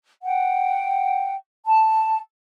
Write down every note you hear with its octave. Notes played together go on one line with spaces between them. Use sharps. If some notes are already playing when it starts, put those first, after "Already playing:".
F#5 G5
A5